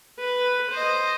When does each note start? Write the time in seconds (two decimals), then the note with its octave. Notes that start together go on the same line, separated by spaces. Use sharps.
0.19 B4
0.71 C5 D#5